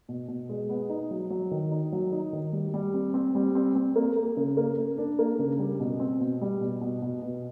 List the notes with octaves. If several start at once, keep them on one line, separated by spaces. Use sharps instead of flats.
B2
B2
G#3
B3
D#4
F#3
F#3
D#3
D#4
F#3
D#4
D#3
G3
G3
C4
C4
G3
C4
C4
A#3
A#3
C#3
A#3
A#3
D4
A#3
C#3
G3
B2
C4
B2
G3
B2
B2
B2
B2